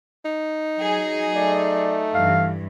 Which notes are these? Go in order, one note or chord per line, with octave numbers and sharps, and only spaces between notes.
D#4
F#3 G#4
A3 D5
G2 E3 F5